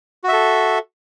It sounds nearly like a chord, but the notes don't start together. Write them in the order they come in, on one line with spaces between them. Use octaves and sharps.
F#4 E5 A4